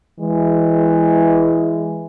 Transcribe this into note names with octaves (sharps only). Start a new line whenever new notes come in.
E3 G#3